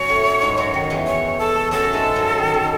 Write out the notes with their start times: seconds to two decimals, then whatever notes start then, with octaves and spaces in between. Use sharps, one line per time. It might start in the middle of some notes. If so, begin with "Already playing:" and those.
Already playing: F#2 F#3 C#5
0.09 A2 A3
0.42 G#2 G#3
0.57 F#2 F#3
0.74 D#3
0.90 E2 E3
1.07 C#5
1.39 A4
1.71 F#2 F#3 A4
1.84 A3
1.93 G#2 G#3
2.16 F#2 F#3
2.38 D#3
2.54 D#3